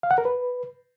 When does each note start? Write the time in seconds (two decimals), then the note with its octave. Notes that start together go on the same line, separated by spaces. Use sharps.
0.03 F5
0.11 F#5
0.18 A#4
0.25 B4